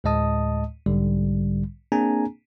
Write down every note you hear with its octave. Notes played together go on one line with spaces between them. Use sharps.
D2 A2 G#3 D#5 A5 D#6
B1 G#2 D3 G3
A#3 C4 D4 G#4 G#5 A#5